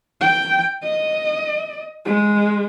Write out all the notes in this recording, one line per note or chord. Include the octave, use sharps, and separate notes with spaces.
G5
D#5
G#3